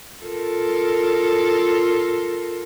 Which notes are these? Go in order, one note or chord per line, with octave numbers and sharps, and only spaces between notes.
F4 A4 A#4